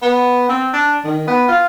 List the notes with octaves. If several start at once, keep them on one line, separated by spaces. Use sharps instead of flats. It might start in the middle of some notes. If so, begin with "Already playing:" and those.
B3
C4
D4
D#3
B3
F4